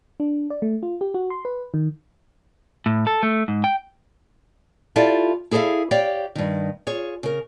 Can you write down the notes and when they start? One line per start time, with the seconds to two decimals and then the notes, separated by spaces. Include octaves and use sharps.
0.20 D4
0.50 D5
0.62 A3
0.83 F4
1.01 G4
1.14 F#4
1.30 C6
1.45 B4
1.74 D#3
2.86 A2
3.07 A4
3.23 A3
3.48 G#2
3.64 G5
4.96 E4 F4 G4 A4 D5 F5
5.51 E4 G#4 A4 C#5 E5 F5
5.91 G4 C#5 D5 F5 G5
6.35 G2 D#3
6.87 F4 G#4 C#5
7.23 C#3 A#4